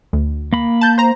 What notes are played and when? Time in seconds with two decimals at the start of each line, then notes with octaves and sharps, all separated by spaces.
0.13 D2
0.53 A#3 B5
0.81 A5 G6
0.98 C5 A#5